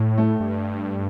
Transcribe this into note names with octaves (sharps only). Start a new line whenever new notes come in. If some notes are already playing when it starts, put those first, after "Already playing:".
Already playing: A2
A3
G2